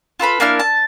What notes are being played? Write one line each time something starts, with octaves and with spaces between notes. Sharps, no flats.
F4 A4 B4 B5
A#3 D4 E4 F6
A5